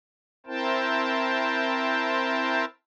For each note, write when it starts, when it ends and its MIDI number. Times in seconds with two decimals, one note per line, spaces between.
0.47 2.65 60
0.47 2.65 64
0.47 2.65 70
0.47 2.65 72
0.47 2.65 79
0.47 2.65 81